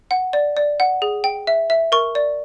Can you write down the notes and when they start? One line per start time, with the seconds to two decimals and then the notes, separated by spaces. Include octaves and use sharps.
0.11 F#5
0.33 D5
0.57 D5
0.80 F#5
1.02 G#4
1.24 G5
1.47 E5
1.70 E5
1.92 A#4 C#6
2.15 D5